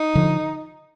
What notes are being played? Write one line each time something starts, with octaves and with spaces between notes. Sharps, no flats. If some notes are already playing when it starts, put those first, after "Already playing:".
Already playing: D#4
D3 F3